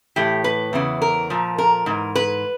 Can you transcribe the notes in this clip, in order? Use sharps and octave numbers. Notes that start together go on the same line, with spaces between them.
A2 E3 G4
B4
E2 C#3 E3
A#4
A#2 F3
A#4
G#2 E3
B4